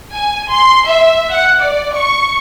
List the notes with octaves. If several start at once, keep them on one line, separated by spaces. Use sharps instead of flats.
G#5
C6
E5
F#5
D5
C#6